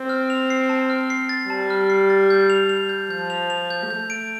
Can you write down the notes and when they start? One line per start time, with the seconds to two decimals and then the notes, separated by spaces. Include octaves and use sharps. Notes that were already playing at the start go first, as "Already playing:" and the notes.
Already playing: C4
0.09 F6
0.30 F7
0.50 C7
0.69 A5
0.90 F6
1.10 C7
1.29 A6
1.50 G3 A5
1.70 F6
1.90 C7
2.10 A6
2.30 G6
2.50 F7
2.69 F7
2.89 G6
3.10 F3 G6
3.30 F7
3.50 F7
3.70 G6
3.90 A3 G6
4.10 D7